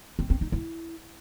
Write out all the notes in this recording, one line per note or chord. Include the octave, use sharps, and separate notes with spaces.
C4
C4
D#4
E4